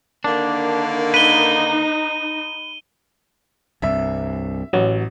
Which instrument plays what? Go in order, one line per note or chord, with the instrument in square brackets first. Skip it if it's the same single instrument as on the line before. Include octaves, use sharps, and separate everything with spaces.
[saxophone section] D3 D#3 A#3 [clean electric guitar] D4
[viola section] D#4 [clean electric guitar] B4 [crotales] D#7 G7
[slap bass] C2 G2 [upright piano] E5
[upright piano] A1 [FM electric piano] F#3